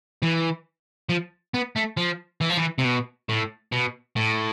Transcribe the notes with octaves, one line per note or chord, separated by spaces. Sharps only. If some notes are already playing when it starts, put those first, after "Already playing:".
E3
F3
B3
A3
F3
E3
F3
E3
C3
B2
A2
B2
A2